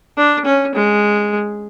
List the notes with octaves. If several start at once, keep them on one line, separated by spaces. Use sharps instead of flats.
D4
C#4
G#3